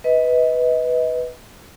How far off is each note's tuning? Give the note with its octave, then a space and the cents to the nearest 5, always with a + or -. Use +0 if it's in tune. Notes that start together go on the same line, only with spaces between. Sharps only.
B4 +0 D#5 +30